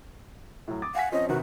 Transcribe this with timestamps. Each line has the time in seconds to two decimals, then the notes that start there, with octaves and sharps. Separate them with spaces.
0.68 A2 F#3
0.82 D6 D#6 A6
0.95 F5 F#5 G#5 B6
1.12 F3 C4 C#4 D#5
1.29 C3 D#3 B3 F#4